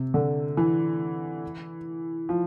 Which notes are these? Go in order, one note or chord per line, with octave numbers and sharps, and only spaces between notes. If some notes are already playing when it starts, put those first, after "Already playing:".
Already playing: C3
D3
E3
F3